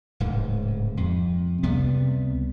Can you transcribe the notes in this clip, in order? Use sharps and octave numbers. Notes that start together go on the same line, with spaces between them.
D1 G#2 C#3
F2
C#2 C3 G3 B3